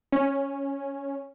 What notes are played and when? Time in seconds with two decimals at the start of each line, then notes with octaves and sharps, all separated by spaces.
0.12 C#4